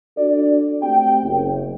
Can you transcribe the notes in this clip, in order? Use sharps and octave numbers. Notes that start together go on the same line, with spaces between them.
D4 F#4 A4 D5
A3 C4 G4 G5
F#1